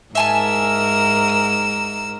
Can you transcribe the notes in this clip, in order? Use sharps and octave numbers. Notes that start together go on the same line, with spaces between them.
G#2 A#4 E5 G#5 A5 E6